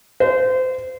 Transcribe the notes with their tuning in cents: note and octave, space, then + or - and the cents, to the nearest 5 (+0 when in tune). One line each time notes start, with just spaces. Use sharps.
C5 -30